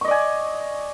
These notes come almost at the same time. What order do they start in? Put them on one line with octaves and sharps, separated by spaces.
C#6 D#5 D5 G#5